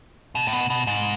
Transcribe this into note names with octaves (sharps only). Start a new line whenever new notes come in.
B2
A2
B2
B2
G#2